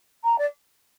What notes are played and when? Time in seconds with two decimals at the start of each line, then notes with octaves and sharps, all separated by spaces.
0.24 A#5
0.38 D5